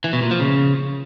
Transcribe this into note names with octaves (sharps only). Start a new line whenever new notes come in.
E3
B2
A#2
F3
C#3